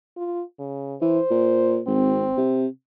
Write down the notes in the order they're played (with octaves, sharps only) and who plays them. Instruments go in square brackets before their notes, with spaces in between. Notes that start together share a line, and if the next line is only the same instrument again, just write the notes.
[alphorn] F4
C#3
[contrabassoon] E3 [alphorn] C5
[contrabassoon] A#2
[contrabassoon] G#1 [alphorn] C4
[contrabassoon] C3